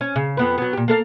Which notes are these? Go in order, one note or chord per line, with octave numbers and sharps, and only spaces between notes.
C#4
C#3
F2 B3 B4
F#3 B3
A#2 G4
A#3 A4 F5